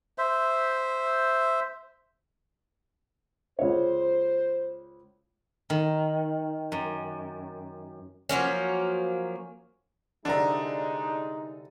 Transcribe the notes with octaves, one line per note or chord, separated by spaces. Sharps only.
C5 E5
C#2 C5 C#5
D#3
F#2
F3 F#3 A#3 C#4
C2 D3 G#3 D4 D#4 A#5